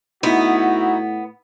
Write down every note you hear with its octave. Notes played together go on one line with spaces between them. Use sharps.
A2 B3 D#4 E4 F#4